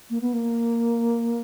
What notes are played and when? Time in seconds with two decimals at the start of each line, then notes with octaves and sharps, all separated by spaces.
0.10 A#3
0.21 B3
0.33 A#3